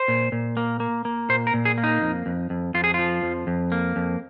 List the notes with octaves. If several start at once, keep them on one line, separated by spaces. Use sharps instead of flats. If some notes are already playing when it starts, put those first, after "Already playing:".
Already playing: C5
A#2
A#2
A#3
A#3
A#3
A#2 C5
A#4
A#2
G#4
A#3
D#4
F2
F2
F2
F2 F4
G#4
F3 F4
F2
F2
A#3
F2